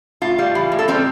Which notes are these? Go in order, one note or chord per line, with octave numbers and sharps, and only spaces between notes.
A2 F4
G3
E3
A2
A4
G3 C4 G4